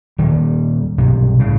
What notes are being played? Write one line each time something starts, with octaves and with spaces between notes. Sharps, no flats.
D#1 D#3 G3
B1 G2 C3
A2 C#3